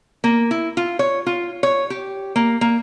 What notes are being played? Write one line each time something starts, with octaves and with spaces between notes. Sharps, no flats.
A#3
E4
F4
C#5
F4
C#5
G4
A#3
A#3